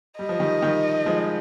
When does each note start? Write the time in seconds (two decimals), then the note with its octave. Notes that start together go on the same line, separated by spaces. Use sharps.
0.19 G3 D#5
0.29 F3
0.40 D#3 G3
0.62 D#3 G3
1.06 F3 G#3